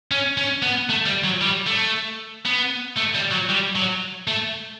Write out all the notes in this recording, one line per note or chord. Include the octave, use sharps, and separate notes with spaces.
C#4
C#4
B3
A3
G3
F#3
G3
A3
B3
A3
G3
F#3
G3
F#3
A3